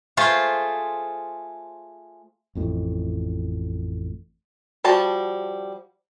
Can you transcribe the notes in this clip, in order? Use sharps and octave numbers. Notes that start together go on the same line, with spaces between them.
A3 F4 G#4 C5
A1 F2 A2
F3 G3 F#4 A5